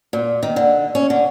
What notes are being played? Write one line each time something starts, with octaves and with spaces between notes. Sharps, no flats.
A#2
D#3
D3
C#4
D3